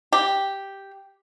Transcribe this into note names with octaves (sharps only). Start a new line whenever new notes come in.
G4